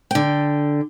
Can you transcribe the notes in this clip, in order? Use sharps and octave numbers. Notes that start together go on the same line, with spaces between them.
D3 G5